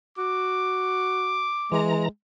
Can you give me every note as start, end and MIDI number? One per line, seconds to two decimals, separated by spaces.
0.18 1.50 66
0.18 1.81 86
1.72 2.09 52
1.72 2.06 56
1.72 2.09 82